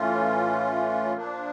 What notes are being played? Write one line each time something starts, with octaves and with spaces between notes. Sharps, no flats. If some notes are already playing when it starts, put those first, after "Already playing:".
Already playing: A2 E3 A3 C#4 F4
A#2 F3 A#3 D4